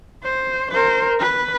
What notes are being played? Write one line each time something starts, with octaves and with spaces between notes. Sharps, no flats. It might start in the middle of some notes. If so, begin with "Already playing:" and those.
C5
A#4 C5
B4